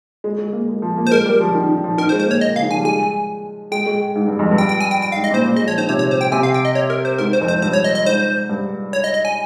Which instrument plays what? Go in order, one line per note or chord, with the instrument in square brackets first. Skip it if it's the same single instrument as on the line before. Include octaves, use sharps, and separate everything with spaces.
[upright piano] G#3
G#3
A#3
G#3
F3
A#3
[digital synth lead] C5
[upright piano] G#3 [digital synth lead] A#4
[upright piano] G3
F3
D#3
D#3
F3
[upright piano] D#3 [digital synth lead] A#4
[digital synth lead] C5
[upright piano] G#3
[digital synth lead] C5
[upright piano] A#3 [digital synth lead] C#5
[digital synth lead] D#5
[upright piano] C#3 [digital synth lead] F5
[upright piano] D#3
[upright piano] F3 [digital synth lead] G#5
[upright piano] G3
[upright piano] G#3 [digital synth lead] G#5
[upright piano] G#3 [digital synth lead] G5
[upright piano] G#3
G#2
G2
F2
G2
[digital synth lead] G5
G5
G#5
G5
G5
F5
[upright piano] G#2
[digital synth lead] D#5
[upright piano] A#2
[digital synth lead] C5
[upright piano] A#2
[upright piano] G#3 [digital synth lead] D#5
[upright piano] F3 [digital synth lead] C#5
[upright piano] D#3 [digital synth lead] C5
[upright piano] C3 [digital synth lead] C#5
[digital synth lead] C#5
C5
G5
[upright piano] C3 [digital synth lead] G#5
[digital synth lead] F5
G5
D#5
C#5
A#4
C5
[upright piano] G#2 [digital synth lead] A#4
[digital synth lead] C5
[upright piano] F2
[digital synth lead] C5
[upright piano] G#2
[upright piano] G2 [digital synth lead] C5
[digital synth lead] C#5
D#5
D#5
[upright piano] G#2 [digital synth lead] C5
[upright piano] G2
[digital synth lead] C#5
D#5
D#5
G#5